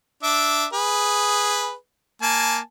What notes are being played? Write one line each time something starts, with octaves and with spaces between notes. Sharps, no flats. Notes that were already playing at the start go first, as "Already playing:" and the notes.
D4 E5 D6
G#4 B4
A#3 G#5 A5